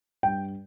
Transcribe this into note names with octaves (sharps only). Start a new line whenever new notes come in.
G2 G5